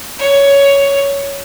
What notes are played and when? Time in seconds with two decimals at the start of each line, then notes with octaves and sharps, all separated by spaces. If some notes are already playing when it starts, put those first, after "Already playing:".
0.19 C#5